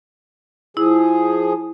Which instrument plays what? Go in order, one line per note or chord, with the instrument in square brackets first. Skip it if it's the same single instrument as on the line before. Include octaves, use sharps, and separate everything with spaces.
[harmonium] F3 G#4 [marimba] E4